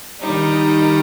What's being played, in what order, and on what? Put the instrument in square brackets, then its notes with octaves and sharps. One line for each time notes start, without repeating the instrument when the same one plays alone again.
[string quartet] D#3 G3 D#4